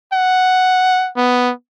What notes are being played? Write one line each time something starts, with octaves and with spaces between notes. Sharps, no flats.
F#5
B3